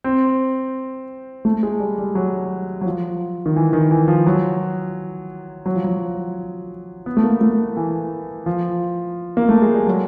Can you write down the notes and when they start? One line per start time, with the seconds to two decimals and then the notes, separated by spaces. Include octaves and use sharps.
0.04 C4
1.45 A3
1.63 G#3
1.80 G3
1.98 G3
2.15 F#3
2.81 F#3
2.86 F3
3.46 D#3
3.56 E3
3.73 D#3
3.91 E3
4.08 F3
4.26 F#3
5.66 F#3
5.76 F3
5.84 F#3
7.06 B3
7.17 A3
7.23 A#3
7.41 A3
7.77 E3
8.46 F3
9.37 A#3
9.49 A3
9.62 G#3
9.74 G3
9.87 F#3